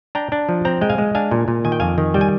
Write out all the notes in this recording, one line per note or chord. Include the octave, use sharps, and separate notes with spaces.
D4 G5 A#5
D4
F3
C4 G5 A#5
G#3 G5
F5 G#5
G#3
D4 F5 G#5
A#2
A#2
D#3 G#5
G5
F2 F5 G#5
D#3
G3 G5
G#5